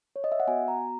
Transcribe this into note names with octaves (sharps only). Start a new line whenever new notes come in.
C#5
D#5
E5
F#5
B3 F#4 G#5
A#5